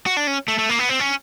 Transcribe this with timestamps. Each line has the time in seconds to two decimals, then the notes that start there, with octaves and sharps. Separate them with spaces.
0.06 F#4
0.17 D4
0.27 C#4
0.48 A3
0.58 A3
0.69 A#3
0.79 B3
0.89 C4
1.00 C#4